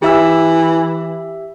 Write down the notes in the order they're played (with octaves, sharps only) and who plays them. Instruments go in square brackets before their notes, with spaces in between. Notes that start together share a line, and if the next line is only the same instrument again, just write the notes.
[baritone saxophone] E3 [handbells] G4 E5 E6